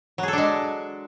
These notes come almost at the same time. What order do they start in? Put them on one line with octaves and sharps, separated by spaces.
F#3 G#4 A4 D4 G#3